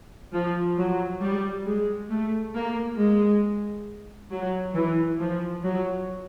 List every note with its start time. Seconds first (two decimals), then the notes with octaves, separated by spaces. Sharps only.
0.34 F3
0.78 F#3
1.22 G3
1.66 G#3
2.11 A3
2.55 A#3
2.99 G#3
4.32 F#3
4.75 E3
5.20 F3
5.64 F#3